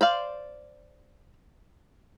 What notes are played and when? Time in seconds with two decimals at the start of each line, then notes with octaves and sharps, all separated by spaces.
0.01 C5 D5 F5